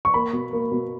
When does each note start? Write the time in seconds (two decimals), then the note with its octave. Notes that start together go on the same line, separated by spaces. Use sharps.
0.05 C#6
0.14 A#3 B5
0.33 B2
0.53 A#3
0.71 B2